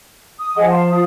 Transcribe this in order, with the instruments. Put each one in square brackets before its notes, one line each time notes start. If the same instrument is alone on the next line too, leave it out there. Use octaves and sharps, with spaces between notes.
[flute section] D#6
[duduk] F3 [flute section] G#4 D#5 F#5
[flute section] F5 A5 C6
F4 F5 D#6